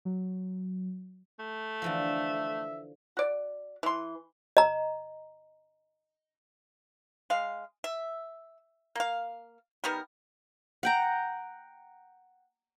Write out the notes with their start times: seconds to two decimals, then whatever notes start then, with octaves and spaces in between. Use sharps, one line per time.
0.05 F#3
1.39 A3
1.82 D3 E3 F3 E5
3.17 F#4 D5
3.83 E3 C6
4.57 D#5 A#5
7.30 G#3 F5
7.84 E5
8.96 A#3 F5
9.84 D#3 G3 B3 A#4
10.83 F#5 G5 A#5